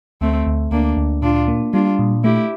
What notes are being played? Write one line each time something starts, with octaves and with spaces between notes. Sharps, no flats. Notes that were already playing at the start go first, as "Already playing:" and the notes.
D2 A3 C4
D2
D2 A#3 D4
D2
A#2 D4 F4
A#3
G3 D4 F4
A#2
A3 E4 G4